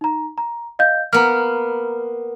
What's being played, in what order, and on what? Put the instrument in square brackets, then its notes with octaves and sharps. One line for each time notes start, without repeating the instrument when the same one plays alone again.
[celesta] D#4 A#5
A#5
D#5 F5 G6
[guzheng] A#3 B3 [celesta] A#5 F6